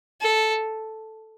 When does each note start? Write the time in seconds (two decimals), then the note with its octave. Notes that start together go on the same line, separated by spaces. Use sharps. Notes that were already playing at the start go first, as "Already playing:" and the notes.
0.21 A4